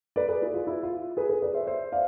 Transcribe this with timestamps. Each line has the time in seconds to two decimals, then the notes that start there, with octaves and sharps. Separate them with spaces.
0.16 B4 D5
0.29 G#4 B4
0.42 E4 G#4
0.54 F4
0.67 E4
0.83 F4
1.17 G#4 B4
1.29 G#4 B4
1.42 B4 D5
1.54 C5 E5
1.67 C5 E5
1.92 D5 F5